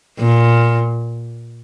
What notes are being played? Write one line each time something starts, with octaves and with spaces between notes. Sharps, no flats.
A#2